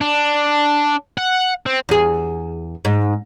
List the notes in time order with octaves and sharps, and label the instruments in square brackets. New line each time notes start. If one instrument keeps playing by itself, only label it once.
[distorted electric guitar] D4
F#5
C4
[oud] E2 G#4
G#2